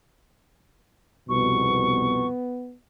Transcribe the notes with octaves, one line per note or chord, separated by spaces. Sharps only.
C2 F2 B2 B3 C#6